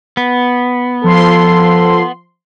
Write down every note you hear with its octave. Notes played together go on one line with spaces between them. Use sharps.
B3
F3 A4 C6